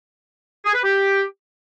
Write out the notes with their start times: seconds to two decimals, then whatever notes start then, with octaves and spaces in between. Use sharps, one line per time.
0.66 G#4
0.74 B4
0.83 G4